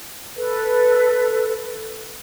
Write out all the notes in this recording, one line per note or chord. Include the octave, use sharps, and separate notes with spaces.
A4 B4